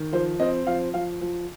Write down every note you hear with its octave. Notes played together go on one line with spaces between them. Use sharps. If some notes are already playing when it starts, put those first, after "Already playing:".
Already playing: D#3
F3 C5
C4 D#5
F3 F5
F3 F5
F3